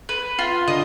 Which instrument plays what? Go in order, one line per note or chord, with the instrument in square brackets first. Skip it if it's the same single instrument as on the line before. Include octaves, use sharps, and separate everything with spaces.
[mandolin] B4
F4
[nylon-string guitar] D3 [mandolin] D#5